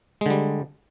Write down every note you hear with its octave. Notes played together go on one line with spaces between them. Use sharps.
D3 G3 G#3